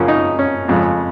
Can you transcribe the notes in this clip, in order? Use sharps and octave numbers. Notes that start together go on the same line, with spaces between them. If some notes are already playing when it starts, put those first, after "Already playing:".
Already playing: F#2 C#3 F3 A#3 C#4
D#4
C#4
F2 C#3 G#3